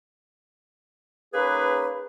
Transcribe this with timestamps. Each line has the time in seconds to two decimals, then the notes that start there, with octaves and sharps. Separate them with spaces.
1.34 A#3 C#4 D#4 G#4 B4